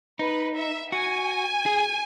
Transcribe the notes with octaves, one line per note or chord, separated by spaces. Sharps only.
D#4 B4
E5
F#4 G#5
G#4